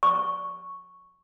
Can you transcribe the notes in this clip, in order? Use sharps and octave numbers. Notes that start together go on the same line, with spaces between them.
C#6